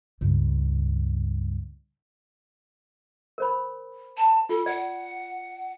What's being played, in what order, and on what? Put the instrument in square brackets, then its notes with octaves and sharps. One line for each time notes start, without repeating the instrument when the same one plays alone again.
[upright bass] C#2 G2
[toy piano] A#4 C5 B5
[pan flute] A5
[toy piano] F4 [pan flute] A4
[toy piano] D5 [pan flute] F#5